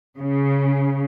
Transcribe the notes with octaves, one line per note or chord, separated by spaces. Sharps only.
C#3